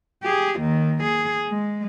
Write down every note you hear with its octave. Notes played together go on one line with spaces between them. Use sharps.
G4 G#4
D#2 D#3
G#4
G#3